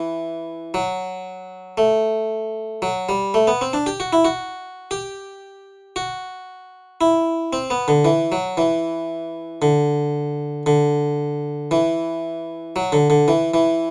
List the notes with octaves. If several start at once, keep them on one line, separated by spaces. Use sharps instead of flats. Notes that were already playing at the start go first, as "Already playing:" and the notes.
Already playing: E3
F#3
A3
F#3
G3
A3
B3
C4
D4
G4
F#4
E4
F#4
G4
F#4
E4
C4
B3
D3
E3
F#3
E3
D3
D3
E3
F#3
D3
D3
E3
E3